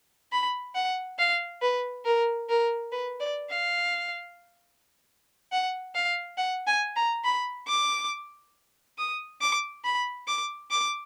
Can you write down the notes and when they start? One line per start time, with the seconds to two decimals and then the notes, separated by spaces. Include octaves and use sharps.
0.32 B5
0.75 F#5
1.19 F5
1.62 B4
2.05 A#4
2.49 A#4
2.92 B4
3.20 D5
3.50 F5
5.52 F#5
5.95 F5
6.38 F#5
6.67 G#5
6.96 A#5
7.24 B5
7.68 D6
8.98 D#6
9.41 D6
9.85 B5
10.28 D6
10.71 D6